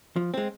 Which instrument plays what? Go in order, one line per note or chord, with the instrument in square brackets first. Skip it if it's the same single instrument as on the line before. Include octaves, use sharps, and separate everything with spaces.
[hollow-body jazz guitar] F3
G#3 C4